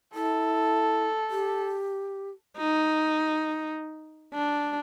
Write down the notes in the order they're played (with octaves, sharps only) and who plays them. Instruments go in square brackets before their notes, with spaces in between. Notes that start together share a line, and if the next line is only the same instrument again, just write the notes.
[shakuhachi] E4 [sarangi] A4
[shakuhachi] G4
[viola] D#4
D4